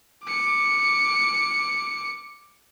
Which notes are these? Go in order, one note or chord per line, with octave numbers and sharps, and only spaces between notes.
D6 C#7